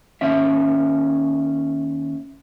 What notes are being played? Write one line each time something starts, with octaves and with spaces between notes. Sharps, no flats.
D#2 C#4 E5